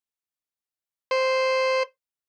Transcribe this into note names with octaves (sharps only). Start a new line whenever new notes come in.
C5